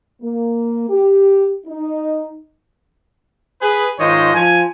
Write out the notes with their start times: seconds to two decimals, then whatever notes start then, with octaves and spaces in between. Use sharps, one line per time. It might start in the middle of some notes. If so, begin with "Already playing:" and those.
0.21 A#3
0.88 G4
1.66 D#4
3.61 G#4 B4
3.99 G#2 D#3 F4 C5 C#5 D#5
4.34 F3 G#5